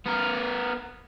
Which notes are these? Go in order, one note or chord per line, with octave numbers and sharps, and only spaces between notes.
B3 A#4